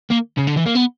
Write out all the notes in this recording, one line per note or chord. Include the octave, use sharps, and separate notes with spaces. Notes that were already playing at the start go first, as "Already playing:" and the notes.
A#3
C#3
D3
E3
A#3
B3